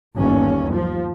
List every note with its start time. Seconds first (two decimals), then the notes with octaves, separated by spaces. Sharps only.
0.16 G1 D#2 C#4
0.71 F3